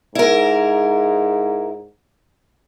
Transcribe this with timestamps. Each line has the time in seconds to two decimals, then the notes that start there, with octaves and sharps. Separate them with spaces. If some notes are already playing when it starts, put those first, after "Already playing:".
0.15 G#2 E4 A#4